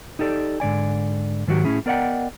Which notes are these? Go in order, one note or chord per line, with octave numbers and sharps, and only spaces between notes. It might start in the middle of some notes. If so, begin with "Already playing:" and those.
D#4 G4 A4 D5
G#2 D3 D5 G#5
G#2 D#3 F#3 F#4 G4
A2 C#4 E4 G#4
B3 A#4 D5 D#5 F#5 G5